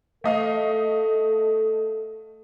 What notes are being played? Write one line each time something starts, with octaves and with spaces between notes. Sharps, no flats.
A3 A4 D#5 F5